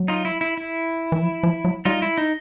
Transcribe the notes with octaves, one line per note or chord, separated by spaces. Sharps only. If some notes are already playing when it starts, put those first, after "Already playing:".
Already playing: F#3
D#4 F4
E4
E4
E4
E3
F3
F3
F#3
G3 D#4 F4
E4
D#4